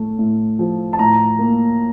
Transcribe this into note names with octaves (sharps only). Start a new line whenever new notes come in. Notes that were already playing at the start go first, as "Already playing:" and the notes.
Already playing: A2 A3
A2
F3
A5
A2 A#5
A#3